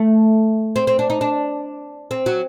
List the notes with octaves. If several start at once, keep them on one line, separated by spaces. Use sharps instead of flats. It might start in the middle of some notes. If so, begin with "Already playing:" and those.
Already playing: A3
C4
C4
D4
D#4
D4
C4
F#3